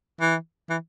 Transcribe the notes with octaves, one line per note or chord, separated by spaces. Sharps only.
E3
E3